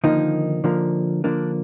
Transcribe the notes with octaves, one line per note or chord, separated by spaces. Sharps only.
D3 D#3 F3 A#3 D#4
D3 F3 A#3
D3 F3 A#3 D4